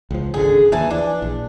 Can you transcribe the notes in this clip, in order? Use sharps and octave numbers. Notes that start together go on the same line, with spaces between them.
C#2 F3
G#1 C#2 D3 G#4
D#2 E3 F3 G#5 A5
E3 D4
A#1